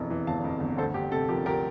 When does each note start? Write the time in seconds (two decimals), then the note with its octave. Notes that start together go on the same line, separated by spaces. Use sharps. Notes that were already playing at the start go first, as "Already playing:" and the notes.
Already playing: E1 F2 E3
0.10 E3
0.27 G1 F5 A5
0.44 F2
0.60 G1
0.77 D2 A4 C5
0.94 D2 G4
1.11 C3 A4
1.28 F3 G4 A#4
1.45 D2 G4 A#4